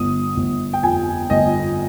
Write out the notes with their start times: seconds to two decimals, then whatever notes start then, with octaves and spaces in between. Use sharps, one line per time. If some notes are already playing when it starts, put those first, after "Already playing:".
Already playing: G1 D#6
0.37 G1
0.73 G5
0.83 F2 G#5
1.30 G1 D#5